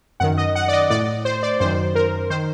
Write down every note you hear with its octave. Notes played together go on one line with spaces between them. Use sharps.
F#2 D#3 F#5
D#5
F#5
D5
D#5
A2 D5
C5
D5
F#2 D#3 C5
A#4
D#3 C5